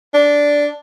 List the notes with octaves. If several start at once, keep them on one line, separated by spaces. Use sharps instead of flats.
D4